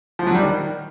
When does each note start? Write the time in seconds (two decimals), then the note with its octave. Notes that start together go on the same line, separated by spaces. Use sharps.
0.19 F3
0.27 F#3
0.35 G3
0.42 D#3